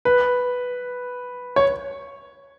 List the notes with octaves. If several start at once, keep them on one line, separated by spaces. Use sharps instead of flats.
B4
C#5